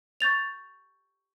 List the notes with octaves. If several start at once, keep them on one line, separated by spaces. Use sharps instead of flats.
C#6 G6 A6 F7